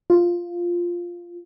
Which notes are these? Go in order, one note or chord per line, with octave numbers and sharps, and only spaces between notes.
F4